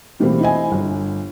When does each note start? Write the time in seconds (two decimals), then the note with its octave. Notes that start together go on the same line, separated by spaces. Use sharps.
0.20 B2 E3 G3 A3 A#3 C4
0.40 E4 C5 D#5 G#5
0.72 G1